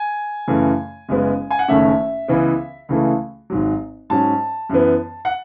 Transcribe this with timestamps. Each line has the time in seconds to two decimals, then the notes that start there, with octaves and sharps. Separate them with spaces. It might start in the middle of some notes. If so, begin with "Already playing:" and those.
Already playing: G#5
0.47 F#2 C#3 E3 A3
1.08 F#1 F#2 C#3 G#3 B3
1.50 G#5
1.59 F#5
1.68 F#1 F#2 D#3 A3 C#4 E5
2.28 C#2 C#3 E3 B3
2.89 C#2 C#3 E3 A3
3.50 G#1 G#2 F#3
4.10 G#2 F#3 C#4 A5
4.69 F#2 E3 B3
5.25 F#5